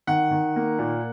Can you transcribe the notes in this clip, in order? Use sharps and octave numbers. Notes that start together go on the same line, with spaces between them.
D#3 F#5
D#3
A#3
A#2